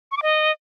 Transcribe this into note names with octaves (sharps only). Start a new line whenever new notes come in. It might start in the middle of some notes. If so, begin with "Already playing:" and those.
C#6
D6
D#5